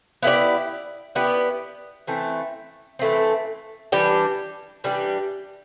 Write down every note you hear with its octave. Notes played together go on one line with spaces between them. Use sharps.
B3 E4 G4 D5
B3 E4 G4 D5
E3 A3 C4
E3 A3 C4
E3 G3 D4 G4
E3 G3 D4 G4